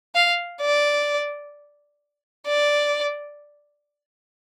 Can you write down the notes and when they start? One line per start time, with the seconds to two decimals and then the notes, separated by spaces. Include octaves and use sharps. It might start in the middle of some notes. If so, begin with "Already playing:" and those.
0.15 F5
0.61 D5
2.46 D5